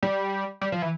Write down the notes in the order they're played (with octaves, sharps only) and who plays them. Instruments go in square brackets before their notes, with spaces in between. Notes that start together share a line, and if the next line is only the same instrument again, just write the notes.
[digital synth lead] G3
G3
F3
E3